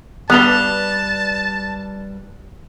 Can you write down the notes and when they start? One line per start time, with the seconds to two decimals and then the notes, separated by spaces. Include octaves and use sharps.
0.30 G2 G3 B3 B4 A5 F#6 F7 G7